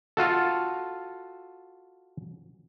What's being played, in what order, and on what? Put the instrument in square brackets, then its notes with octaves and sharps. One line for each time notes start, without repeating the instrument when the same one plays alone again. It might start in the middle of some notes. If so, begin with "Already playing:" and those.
[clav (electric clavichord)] F4 F#4 A4